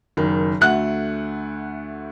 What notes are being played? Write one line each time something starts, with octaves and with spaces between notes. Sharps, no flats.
F#1 D#3
D2 A3 F#5 F#6